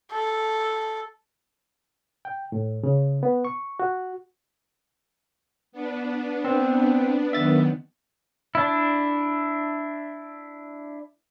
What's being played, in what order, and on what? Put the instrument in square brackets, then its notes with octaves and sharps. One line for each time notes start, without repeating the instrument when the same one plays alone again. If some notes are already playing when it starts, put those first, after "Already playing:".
[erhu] A4
[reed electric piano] G5
A2
C#3
B3
C#6
F#4
[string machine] B3 D4
[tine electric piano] C4
[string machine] F#2 D#3 B3 [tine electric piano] E5 A6
[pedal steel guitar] D4 E4